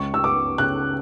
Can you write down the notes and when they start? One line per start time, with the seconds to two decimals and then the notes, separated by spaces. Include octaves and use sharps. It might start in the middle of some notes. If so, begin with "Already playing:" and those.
Already playing: C#2 C#6
0.14 E6
0.24 B3 D6
0.58 C#3 F#6